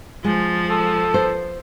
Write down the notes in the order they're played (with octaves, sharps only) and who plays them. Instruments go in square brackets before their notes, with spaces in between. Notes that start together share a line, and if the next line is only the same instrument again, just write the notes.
[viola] F3 [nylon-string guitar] G#3
[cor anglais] A4
[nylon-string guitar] C5